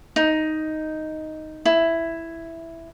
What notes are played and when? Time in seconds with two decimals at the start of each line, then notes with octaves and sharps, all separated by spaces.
0.16 D#4
1.65 E4